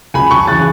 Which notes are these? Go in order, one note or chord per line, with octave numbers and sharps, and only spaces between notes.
C#2 G#5 B5
A5 C#6
C#3 E3 F#6 A6